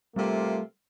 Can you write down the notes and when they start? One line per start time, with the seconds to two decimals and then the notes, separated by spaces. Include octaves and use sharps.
0.16 C3 G3 A3 A#3 C4 F4